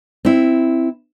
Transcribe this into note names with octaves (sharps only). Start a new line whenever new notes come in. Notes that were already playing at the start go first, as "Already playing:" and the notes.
C4 E4